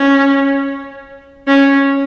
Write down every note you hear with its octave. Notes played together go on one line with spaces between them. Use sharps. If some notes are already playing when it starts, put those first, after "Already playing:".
Already playing: C#4
C#4